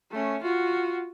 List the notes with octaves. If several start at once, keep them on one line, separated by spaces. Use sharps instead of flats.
A3 C#4
F4 F#4